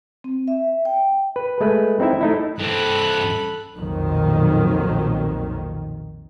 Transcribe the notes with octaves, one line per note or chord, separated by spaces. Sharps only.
C4
E5
G5
B4
G#3 A3 B4
C4 D#4 E4 E5
A3 D#4 E4
G2 C4 A4 B5 F#6
B1 F2 A#2 D#3 F#3